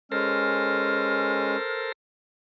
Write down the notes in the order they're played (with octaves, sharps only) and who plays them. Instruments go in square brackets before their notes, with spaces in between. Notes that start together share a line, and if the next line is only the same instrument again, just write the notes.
[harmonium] G#3 C#4 [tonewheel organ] A4 A#4 C5 [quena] F6